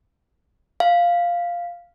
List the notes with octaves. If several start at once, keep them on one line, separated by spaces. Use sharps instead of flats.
F5